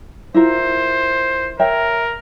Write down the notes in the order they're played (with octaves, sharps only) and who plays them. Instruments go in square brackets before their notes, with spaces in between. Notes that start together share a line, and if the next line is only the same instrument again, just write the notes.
[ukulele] E4 F4 A#4 [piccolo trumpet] C5
[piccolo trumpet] A#4 [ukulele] C#5 E5 G5